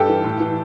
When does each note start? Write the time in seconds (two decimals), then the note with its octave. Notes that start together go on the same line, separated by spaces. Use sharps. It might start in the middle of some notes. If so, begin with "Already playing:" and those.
Already playing: G2 G4 A4
0.09 E3
0.24 A2
0.40 E3